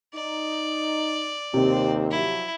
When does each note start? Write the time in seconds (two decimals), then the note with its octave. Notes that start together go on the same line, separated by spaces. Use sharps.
0.15 D#4 D5
1.54 D#2 C3 C4
2.11 F3 F#3 E4